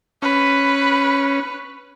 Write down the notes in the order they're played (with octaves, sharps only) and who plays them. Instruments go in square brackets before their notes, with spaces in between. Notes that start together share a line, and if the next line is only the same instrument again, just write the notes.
[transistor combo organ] C#4 [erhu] B4